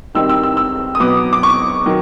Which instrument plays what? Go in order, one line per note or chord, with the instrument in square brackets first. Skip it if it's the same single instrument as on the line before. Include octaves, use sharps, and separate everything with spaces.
[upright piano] D#3 G3 C4 D#4 E6
E6
E6
E6
D#6
B2 F#3 B3 D6
D6
C#6
D#3 F#3